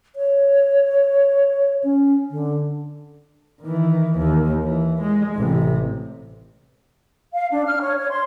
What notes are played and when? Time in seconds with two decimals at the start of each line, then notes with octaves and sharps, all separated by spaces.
0.16 C#5
1.84 C#4
2.31 D3
3.62 D#3 E3
4.16 D#2
4.63 E3
5.01 G#3
5.36 A1 C3
7.34 F5
7.52 D4
7.65 F6
7.81 C#5
7.96 C#5
8.10 C6